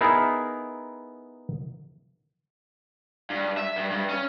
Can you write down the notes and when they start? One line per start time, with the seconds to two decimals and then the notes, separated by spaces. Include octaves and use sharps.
0.01 B3 D#4 E4 G#4 A#4
3.30 G2
3.57 E5
3.76 G2
3.91 G2
4.09 C#4